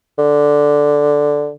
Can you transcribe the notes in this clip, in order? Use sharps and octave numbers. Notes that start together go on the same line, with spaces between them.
D3